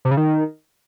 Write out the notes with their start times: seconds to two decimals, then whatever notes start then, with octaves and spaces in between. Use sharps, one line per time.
0.05 C3
0.11 C#3
0.17 D#3